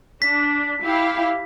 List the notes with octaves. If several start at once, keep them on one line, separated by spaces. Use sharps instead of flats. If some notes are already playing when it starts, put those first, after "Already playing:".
D4 B6
E4 G4 F5